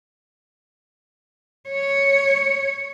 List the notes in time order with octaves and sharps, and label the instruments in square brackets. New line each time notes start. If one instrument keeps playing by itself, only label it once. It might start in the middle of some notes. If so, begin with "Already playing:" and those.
[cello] C#5